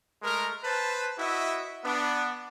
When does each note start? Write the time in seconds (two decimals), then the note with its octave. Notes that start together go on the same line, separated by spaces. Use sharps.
0.22 G#3 A3 A#4
0.64 B4 C5 A5
1.18 E4 F#4 D#5 E5
1.84 B3 D4